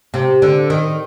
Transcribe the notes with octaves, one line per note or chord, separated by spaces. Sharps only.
C3
D3
D#3